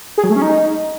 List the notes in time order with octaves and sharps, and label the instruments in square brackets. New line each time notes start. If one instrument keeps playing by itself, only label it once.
[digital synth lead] G#4
F#3
A3
C#4
D#4